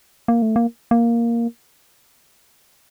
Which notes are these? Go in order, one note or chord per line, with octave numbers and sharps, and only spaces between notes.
A#3
A3
A#3
A#3